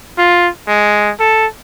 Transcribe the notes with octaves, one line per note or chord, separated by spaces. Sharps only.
F4
G#3
A4